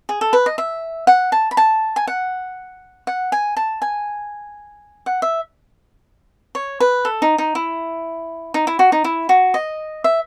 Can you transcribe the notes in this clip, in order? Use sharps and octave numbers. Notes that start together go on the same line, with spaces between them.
G#4
A4
B4
D#5
E5
F#5
A5
B5
A5
G#5
F#5
F#5
G#5
A5
G#5
F#5
E5
C#5
B4
A4
D#4
D#4
E4
D#4
E4
F#4
D#4
E4
F#4
D#5
E5